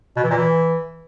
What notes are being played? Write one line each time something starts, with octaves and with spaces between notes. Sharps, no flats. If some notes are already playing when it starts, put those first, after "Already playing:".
B2
E3
A#2
E3